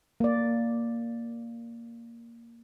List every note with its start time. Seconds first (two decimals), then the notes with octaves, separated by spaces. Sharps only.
0.20 A#3 D5